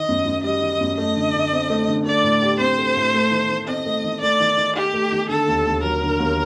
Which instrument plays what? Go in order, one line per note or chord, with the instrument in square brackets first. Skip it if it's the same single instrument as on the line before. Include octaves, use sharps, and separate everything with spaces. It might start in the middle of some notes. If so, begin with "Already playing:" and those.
Already playing: [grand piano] D#3 [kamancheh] D#5
[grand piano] F#2
F#2
[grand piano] G3 [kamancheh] D#5
[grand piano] D#3
F#2
[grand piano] A3 [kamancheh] D#5
[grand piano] D3
D3
C4
A3
D3
[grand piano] A3 [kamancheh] D5
[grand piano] A2
G4
[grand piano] C4 [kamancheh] C5
[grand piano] A3
A2
A3
D#3
D#3
[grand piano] C4 [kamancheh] D#5
[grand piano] A3
D#3
[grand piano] A3 [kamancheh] D5
[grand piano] D#3
D#3
[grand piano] D#4 [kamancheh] G4
[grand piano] A3
D#3
[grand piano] D3 [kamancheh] A4
[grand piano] D#2
D#2
[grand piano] F#3 [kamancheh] A#4
[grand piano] D3
D#2